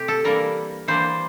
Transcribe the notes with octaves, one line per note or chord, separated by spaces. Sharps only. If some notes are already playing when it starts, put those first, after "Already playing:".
Already playing: C3 A3 G4
A4
E3 G3 A#3 D4 A#4
E3 G3 A#3 D4 C5